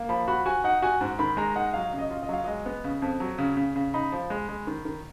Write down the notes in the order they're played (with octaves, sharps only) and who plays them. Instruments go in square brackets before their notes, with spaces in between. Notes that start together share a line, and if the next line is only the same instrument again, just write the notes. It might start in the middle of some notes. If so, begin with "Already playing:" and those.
Already playing: [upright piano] A#3
[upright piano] F3 [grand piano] B5
[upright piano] F#4 [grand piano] B5
[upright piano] F#4 [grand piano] G#5
[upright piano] D#4 [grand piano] F#5
[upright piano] F#4 [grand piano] G#5
[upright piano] G#2
[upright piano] D#3 [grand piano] B5
[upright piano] G#3 [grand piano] A#5
[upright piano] D#4 [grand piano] F#5
[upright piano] F#3 [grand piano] F5
[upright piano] C#3
[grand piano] D#5
[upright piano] F4
[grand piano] D#5
[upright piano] F#3 [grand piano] F5
[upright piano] G#3 [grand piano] D#5
[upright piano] B3
C#3
F2
F#3
C#3
C#3
C#3
[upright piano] D#4 [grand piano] B5
[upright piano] F3
G#3
G#3
D#3
D#3